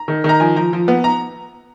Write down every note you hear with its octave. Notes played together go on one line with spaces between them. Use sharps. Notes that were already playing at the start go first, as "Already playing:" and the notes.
Already playing: A#5
D#3
D#3 A#5
F3 G#5
F3 A#5
F3
B3
A#5